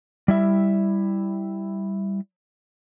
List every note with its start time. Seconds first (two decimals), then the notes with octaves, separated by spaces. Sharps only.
0.28 G3 E4 E5